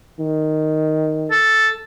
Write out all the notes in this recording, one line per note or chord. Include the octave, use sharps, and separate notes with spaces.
D#3
A4